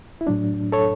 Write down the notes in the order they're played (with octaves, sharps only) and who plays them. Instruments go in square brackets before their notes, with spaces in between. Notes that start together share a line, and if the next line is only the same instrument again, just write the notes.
[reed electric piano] E4
A2 F#3 D4
A4 C#5